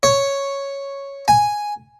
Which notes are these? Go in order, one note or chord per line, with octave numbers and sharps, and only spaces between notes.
C#5
G#5